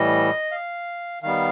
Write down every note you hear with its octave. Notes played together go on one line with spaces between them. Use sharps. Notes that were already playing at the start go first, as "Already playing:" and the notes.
Already playing: A2 E3 G3 D#5
F5
D#3 G3 B3 F5